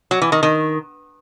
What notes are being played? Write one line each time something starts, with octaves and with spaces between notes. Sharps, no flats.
F#3
E3
D#3
D#3